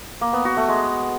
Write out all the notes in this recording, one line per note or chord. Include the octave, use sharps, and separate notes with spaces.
A#3
B3
F#4
A3
G#3